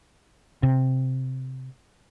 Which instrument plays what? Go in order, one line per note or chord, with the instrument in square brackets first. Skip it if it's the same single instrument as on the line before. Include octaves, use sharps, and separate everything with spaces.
[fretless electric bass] C3